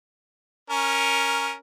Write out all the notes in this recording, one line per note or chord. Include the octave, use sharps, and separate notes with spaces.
C#4 A#4